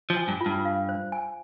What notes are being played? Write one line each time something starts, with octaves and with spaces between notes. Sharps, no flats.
F3
G#5
G2
F4
G2
F5
C5
G#5